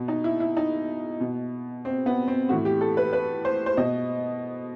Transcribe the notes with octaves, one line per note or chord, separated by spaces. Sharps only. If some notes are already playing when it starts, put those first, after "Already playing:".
Already playing: B2
D#4
E4
E4
D#4
B2
C4
B3
C4
A2 E3 F#4
G4
A4
B4
B4
C5
C5
B2 D#5